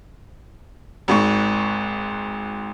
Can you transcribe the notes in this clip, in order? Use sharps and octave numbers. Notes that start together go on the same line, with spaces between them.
G#1 G#2 C#6